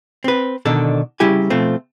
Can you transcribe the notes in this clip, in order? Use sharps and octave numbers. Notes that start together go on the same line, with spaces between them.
C4 B4
B2 D3 D#3 D4 A4
C#3 G3 E4 G4 G#5
B2 F3 A3 C4